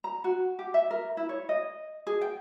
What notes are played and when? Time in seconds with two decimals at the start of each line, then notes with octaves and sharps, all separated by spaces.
0.04 A#5
0.24 F#4
0.59 G4
0.74 E5
0.91 A#4
1.17 E4
1.29 C#5
1.49 D#5
2.07 G#4
2.21 G5